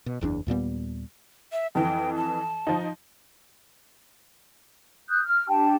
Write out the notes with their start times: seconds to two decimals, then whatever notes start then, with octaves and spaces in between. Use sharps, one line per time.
0.06 B2
0.21 F#1 E2 G#2 D4
0.47 D#2 A#2 G3 B3
1.52 E5
1.75 F2 E3 G5
2.15 A5
2.67 F3 D#4
5.08 D#6 F#6 G6
5.24 F6
5.49 D4 G4 G5 A5